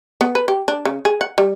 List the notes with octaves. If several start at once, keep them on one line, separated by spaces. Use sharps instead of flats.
B3
B4
G4
D4
C#3
G#4
F#5
G3